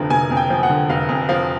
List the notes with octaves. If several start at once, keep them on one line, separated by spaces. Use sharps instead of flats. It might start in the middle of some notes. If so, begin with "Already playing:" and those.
Already playing: F1 F2 D3 F3
F1 G#5
F2
G5
F3
F#5
D3
F1 F5
F2
F3 F5